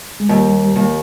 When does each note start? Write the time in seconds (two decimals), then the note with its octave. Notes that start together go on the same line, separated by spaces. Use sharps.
0.20 G#3
0.29 D#2 G3
0.76 D#2